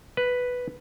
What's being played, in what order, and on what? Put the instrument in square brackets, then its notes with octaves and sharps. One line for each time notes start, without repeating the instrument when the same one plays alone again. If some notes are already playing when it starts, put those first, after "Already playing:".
[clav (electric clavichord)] B4